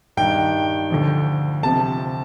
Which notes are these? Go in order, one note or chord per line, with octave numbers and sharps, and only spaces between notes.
G2 D#3 G5
D2 D3 F3
D2 C3 F3 A5